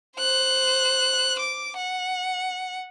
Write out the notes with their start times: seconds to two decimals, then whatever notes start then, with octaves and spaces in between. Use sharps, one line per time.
0.17 C5 F#6
1.39 D6
1.77 F#5